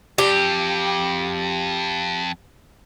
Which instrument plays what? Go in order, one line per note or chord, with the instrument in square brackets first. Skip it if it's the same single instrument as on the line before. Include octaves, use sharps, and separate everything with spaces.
[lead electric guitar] F2 [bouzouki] G4